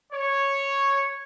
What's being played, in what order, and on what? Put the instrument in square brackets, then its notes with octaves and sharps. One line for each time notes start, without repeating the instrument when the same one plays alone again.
[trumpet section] C#5